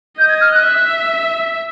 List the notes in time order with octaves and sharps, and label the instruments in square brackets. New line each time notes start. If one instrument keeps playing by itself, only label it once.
[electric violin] D#5 [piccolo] G6
[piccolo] G#6
F6
F#6
[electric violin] E5